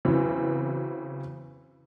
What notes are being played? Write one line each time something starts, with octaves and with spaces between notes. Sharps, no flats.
C#3 E3 F#3 B3 C4